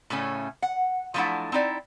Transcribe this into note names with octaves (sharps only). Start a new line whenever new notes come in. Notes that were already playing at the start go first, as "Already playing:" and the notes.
A2 C#3 A3 C#4
F#5
F3 F#3 A3 D4 E4 F#5
C4 D#4 E4 D5